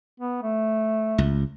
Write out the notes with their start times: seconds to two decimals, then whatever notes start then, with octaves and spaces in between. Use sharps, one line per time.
0.20 B3
0.43 A3
1.18 C#2